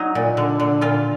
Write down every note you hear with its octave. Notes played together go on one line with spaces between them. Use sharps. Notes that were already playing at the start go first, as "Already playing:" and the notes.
Already playing: F#3 D#4
A#2
D3
D3
A#2 F4